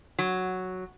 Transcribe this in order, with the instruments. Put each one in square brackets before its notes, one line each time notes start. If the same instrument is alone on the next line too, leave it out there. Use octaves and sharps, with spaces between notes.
[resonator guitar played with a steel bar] F#3